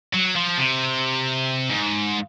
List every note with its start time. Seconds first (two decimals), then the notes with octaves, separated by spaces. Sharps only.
0.13 F#3
0.35 F3
0.58 C3
1.70 G#2